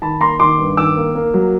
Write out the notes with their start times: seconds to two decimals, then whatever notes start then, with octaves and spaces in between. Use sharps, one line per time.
0.02 D#3 A5 B5
0.21 A#3 A#5 C6
0.39 D#3 C6 D6
0.58 G2
0.77 D#3 D6 E6
0.97 A#3
1.15 A#3
1.34 F#3